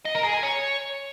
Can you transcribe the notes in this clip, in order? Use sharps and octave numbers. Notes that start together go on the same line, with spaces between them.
D#5
A#4
G#4
G#5
C#5